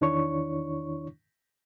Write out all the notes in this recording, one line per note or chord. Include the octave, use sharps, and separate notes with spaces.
E2 D#3 D4 E4 C#5 C#6